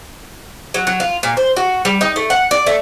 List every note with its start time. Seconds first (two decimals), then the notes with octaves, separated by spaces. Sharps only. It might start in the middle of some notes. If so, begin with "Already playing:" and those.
0.74 F#3
0.87 F#3
1.00 F4
1.23 A#2
1.37 C5
1.56 F#4
1.85 G3
2.01 D#4
2.16 A3
2.30 F#5
2.51 D5
2.67 A3